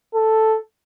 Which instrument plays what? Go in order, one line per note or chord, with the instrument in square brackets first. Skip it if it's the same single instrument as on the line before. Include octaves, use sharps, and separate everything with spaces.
[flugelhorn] A4